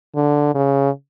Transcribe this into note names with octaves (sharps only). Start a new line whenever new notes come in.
D3
C#3